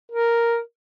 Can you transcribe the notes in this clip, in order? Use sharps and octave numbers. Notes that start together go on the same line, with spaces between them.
A#4